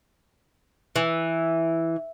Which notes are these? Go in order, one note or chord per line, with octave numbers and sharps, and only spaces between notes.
E3